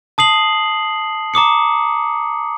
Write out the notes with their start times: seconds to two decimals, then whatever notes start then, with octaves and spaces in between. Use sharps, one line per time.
0.18 A5 D#6 C7 F#7
1.34 A#5 D6 D#6 C#7